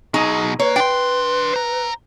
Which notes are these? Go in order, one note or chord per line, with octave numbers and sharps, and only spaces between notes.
B2 F#3 D#4 G#4
A#3 B4 C#5
D4 G5 C6
C5 A#5